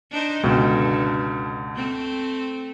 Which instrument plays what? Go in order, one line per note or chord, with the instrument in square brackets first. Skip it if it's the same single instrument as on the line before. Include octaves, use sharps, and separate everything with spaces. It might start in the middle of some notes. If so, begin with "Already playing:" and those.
[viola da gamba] D4 D#4 C5
[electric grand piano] C#2 B2 [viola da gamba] G2 D3
[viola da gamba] A3 C4